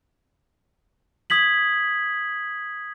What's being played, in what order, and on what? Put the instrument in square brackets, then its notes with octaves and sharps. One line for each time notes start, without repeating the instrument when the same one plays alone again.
[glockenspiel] D#6 G#6 B6 F#7